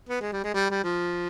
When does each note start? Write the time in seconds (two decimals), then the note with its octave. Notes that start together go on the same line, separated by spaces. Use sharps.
0.09 B3
0.21 G#3
0.32 G3
0.44 G#3
0.54 G3
0.70 G3
0.84 F3